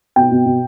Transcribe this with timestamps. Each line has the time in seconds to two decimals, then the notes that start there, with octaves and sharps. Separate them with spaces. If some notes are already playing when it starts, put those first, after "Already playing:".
0.16 B2 G5
0.31 B2
0.46 B2